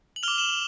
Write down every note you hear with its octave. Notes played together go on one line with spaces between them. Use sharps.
F#7
F6 F7 G7
D6
E7 F#7